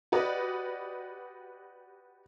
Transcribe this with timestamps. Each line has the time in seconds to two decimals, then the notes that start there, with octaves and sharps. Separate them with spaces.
0.12 F#4 G4 B4 D5 D#5